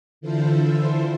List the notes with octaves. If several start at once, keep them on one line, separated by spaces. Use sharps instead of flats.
D3 E3 E4 F4 A4 C5